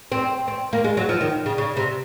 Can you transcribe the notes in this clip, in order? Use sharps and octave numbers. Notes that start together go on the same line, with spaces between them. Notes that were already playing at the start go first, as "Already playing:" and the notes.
C4
C4
A#3
G#3
F#3
F3
D#3
C#3
C#3
C3